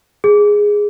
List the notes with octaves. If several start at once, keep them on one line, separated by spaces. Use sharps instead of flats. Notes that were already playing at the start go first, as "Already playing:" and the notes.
G#4